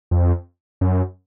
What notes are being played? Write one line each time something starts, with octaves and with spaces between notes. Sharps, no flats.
F2
F#2